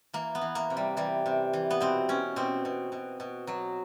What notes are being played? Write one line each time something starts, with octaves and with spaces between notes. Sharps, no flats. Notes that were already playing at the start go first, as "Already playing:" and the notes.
E3 A#3
B3
E3
A#3
C3
G3
E3 G3
C3
E3
B3
B2 C4
B2 C#4
B2 C4
B2
B2
B2
B2 F#3